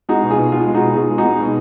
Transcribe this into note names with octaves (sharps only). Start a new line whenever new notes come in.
G#3 D#4 F#4
B2
F4 G#4
B2
G#3 F4 G#4
G#3
D#4 F#4
B2
B2 F4 G#4
G#3
D#4 F#4
G#3
B2